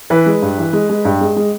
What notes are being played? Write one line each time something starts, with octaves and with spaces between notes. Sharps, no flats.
E3 B4
G#3
G2
E3
G#3
G#3
G2
G#3
G#3